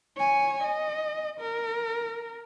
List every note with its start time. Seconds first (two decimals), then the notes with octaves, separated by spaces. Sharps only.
0.17 C#5 G#5
0.64 D#5
1.40 A#4